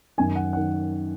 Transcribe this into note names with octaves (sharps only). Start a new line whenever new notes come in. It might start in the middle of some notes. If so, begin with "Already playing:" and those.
F#2 D#3 G#5
F#5
F#5
D#3